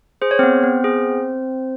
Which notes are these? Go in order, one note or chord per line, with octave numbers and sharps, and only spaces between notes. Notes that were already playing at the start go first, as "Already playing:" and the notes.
G#4 C5
C#5
B3 C4 C5
B3
G#4